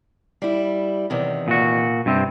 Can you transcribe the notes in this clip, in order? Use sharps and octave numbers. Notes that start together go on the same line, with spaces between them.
G3 E4
E2 C3 D#3
A#2 F#4
G2 C3 C4